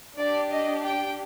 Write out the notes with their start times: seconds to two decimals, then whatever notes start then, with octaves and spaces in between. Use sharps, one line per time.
0.17 D4 G4 D5
0.51 D#5
0.84 G5